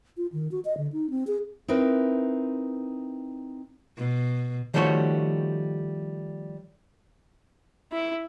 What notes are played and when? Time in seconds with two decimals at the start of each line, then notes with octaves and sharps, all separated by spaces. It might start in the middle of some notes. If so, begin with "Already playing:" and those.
0.17 F4
0.32 D#3
0.52 F#4
0.65 D#5
0.77 D3
0.93 D#4
1.10 C4
1.27 G#4
1.68 C4 D#4 E4 A#4 B4
3.97 B2
4.74 D#3 F3 G3 A3 F#4 C#5
7.92 E4